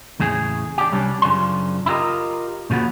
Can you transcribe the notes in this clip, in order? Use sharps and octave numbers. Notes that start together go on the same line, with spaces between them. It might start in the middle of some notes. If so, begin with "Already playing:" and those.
E2 A2 C#3 G#4
D4 G4
C2 G3 C#4 D4
F#2 C#3 F3 D4 C6
E4 F4 G4 A#4 D#5
A#2 C#3 F3 B3 F#4